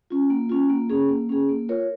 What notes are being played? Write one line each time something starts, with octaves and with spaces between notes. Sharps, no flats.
C#4 F4
A#3
C#4 F4
A#3
C#4 G#4
A#3
C#4 G#4
A#3
F4 A#4 C#5